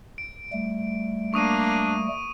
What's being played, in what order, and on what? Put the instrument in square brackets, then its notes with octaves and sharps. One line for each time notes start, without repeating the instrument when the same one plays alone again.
[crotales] D7
[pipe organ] G3 A3
[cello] A#3 [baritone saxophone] D4 [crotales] C#6 D#6 D#7